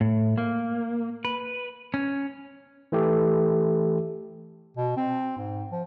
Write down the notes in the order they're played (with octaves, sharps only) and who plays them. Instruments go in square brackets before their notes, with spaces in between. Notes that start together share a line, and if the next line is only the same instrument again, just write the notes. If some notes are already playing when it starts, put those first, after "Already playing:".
[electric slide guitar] A2
A#3
B4
C#4
[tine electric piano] E3 A3 G4 A4
[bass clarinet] B2
C4
G#2
F3